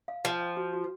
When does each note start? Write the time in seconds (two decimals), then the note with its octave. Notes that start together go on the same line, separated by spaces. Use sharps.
0.08 F5
0.25 F3 G5
0.41 G5
0.57 F#4
0.73 F#4